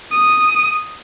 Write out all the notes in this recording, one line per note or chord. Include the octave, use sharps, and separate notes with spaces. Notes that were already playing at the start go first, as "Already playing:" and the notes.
D#6